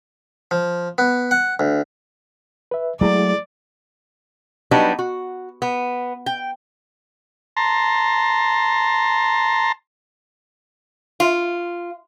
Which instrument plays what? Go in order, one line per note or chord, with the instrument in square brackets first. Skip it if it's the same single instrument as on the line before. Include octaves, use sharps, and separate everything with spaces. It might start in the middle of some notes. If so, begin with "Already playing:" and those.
[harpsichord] F3
B3
F#5
D2
[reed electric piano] B4 E5
[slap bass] F#3 A3 [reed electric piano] G#3 E4 G#4 [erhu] D5
[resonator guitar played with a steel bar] F#3 G3 B3 D4 D#4
F#4
B3
G5
[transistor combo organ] A5 A#5 C6
[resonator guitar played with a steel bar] F4